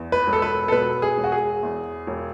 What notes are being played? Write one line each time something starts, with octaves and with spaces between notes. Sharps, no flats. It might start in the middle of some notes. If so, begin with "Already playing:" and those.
Already playing: E2
B4
E1
A4
B4
A4
B2 B4
G#4
E1
F#4
G#4
E2
E1